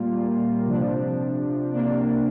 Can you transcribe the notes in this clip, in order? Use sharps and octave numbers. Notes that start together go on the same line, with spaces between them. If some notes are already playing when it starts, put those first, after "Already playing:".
Already playing: A#2 G3 A#3 F4
C3 F3 D4
C3 A#3 D4